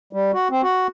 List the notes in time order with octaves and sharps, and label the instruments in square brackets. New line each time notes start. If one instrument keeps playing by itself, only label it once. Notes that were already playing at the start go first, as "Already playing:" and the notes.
[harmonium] G3
F#4
C4
F#4